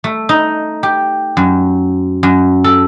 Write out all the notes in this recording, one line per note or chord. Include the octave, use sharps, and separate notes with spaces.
A3
D#4
G4
F#2
F#2
A4